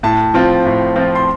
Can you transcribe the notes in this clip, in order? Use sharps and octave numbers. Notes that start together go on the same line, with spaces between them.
A2 A5
F3 C4 F4
A2
F3 C4 F4
C6